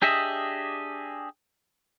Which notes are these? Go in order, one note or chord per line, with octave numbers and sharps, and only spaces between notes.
D4 G4 G#4 D#5 E5